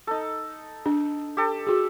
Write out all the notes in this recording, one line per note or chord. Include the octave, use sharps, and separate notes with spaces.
D#4 A4
D4
G4 A4
F#4 G#4